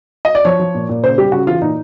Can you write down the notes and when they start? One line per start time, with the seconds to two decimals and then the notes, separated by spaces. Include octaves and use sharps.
0.25 D#5
0.35 D5
0.45 F3 C#5
0.60 F3
0.75 A#2
0.89 A#2
1.03 C#3 C5
1.18 G3 G4
1.32 C#3 F#4
1.47 E3 F4
1.62 A#2 D#4